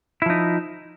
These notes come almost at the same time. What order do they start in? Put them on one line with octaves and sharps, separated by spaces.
E4 F3 D#4